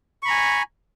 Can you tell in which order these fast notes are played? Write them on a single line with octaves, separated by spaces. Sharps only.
C#6 B5 A#5 G#5